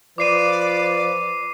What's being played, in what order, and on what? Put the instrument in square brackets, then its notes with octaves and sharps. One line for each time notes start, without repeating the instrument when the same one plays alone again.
[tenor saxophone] F3 [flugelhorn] B4 [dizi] D5 [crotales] D6 C7 D#7